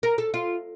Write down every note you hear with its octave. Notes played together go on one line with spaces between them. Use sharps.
A#4
A4
F4